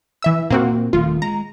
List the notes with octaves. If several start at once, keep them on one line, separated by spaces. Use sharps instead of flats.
E3 E5 E6
A#2 A#3 C4 F#4
D#1 D#3 A3 F4
G#3 A#5